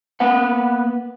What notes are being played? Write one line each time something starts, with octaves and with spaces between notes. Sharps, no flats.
A#3 B3 B4 F#5